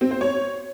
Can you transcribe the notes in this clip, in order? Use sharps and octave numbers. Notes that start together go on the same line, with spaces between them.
C4
C5
C#5